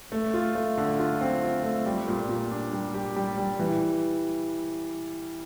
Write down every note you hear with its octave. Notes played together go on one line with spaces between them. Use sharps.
A3
F4
A3
D3
F4
C4
F4
A3
G3
A#2
A#2
D4
G3
G4
G3
G3
E3